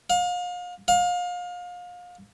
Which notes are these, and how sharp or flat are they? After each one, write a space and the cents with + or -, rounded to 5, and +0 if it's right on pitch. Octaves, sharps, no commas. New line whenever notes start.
F5 +35
F5 +30